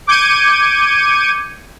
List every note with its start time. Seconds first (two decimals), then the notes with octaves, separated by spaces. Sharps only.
0.07 D6 G6 G#6 C#7 D#7